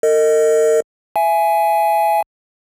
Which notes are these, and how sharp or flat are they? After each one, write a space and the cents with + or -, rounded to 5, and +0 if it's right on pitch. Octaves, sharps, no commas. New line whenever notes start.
A#4 -45 D#5 +0
E5 +20 G#5 +10